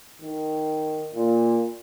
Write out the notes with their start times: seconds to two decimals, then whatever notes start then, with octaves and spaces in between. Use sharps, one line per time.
0.22 D#3
1.15 A#2